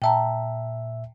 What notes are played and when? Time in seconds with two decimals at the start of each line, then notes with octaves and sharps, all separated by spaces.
0.02 A#2 E5 G5 A5 A#5